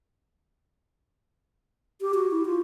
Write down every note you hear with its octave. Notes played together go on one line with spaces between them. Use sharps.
G4
F#4
E4
F4